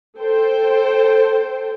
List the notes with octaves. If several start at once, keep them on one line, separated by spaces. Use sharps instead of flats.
A4 C5 G5